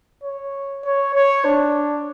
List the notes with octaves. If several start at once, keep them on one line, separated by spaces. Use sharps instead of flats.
C#5
C#5
C#5
D4